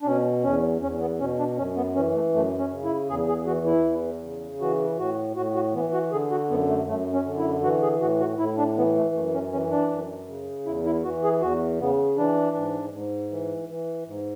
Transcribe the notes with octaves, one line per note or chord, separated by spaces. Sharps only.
D4
B2 C#4
E2 C#4
E2 C#4
B3
B2 C#4
D4
F#2 C#4
B3
E3 C#4
A3
F#2 A3
C#4
C#3
E4
E2 G#4
G#4
E3 F#4
E4
E2
C#3
E3 F#4
A2 F#4
A2 F#4
F#4
E3 B3
F#4
D3 G#4
F#4
F#2 B3
A3
F#2 A3
C#4
D3
E4
E3 F#4
G#4
A2 F#4
F#4
A2 E4
D4
E3 B3
A3
F#2 A3
C#4
E3 C#4
D4
F#2
C#3
E2 E4
E4
E3 F#4
G#4
E2 F#4
C#3 B3
E3 D4
G#2
G#2
E3
E3
G#2